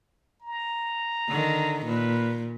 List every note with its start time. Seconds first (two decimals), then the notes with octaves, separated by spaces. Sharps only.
0.42 A#5
1.28 D3 D#3
1.86 A#2 B4